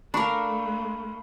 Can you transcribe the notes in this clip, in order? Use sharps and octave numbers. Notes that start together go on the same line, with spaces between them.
A3 D4 A#4 F5 B5 C#6